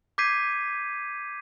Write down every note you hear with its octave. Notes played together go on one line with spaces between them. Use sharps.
D6 G6 G#6 B6 C7 D#7